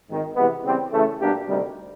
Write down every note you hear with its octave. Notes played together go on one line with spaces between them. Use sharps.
G#1 G#2 D#3
C3 E3 G#3 B3
C#3 E3 G3 C4
C#3 E3 A3
B2 G3 A#3 D4 G4
D2 C3 D#3 G3